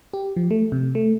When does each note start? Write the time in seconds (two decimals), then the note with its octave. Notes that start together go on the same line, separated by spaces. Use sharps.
0.14 G4
0.37 F3
0.51 A3
0.72 C3
0.95 A3